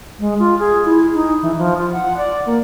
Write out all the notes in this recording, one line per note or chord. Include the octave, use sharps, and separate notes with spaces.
G#3
F4
G#4
E4
D#4
E3
F3
F4
F#5
D5
A#3